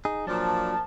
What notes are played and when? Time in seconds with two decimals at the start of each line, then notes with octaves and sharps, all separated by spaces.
0.05 D#4 G#4
0.27 A#2 F3 F#3 D4 A5